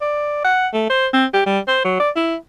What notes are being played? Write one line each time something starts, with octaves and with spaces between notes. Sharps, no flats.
D5
F#5
A3
C5
C4
G4
G3
C5
F#3
D5
E4